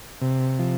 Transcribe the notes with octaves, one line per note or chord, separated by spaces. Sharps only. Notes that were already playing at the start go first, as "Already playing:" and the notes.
C3
F3